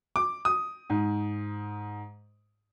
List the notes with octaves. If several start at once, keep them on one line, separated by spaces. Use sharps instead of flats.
D6
D#6
G#2